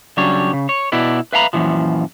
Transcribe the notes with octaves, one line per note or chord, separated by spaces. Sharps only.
C#3 F#3 G3 D4 C#5
C#3
C#5
B2 E4 B4 D5
B4 E5 F5 G5 A#5 B5
F#2 A#2 E3 F3